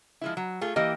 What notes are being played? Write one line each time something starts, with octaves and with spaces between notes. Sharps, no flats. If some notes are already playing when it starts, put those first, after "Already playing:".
F3 G#3 E4
F#3
A3 F4 G#4
E3 A#3 G4 D#5